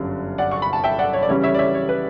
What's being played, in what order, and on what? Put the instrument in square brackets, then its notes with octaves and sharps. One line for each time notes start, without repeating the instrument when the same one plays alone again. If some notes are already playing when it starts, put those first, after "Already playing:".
Already playing: [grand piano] G1 F#2 D3 G3
[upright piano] D5 F#5
C#6
B5
A5
E5 G5
D5 F#5
C#5
D5
[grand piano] C#3 E3 G3 C#4 [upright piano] C#5
[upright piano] C#5 E5
D5
C#5 E5
C#5
B4